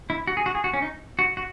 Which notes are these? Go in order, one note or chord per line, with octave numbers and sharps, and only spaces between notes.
E4
F#4
G#4
F#4
G#4
F#4
C#4
D#4
F#4
F#4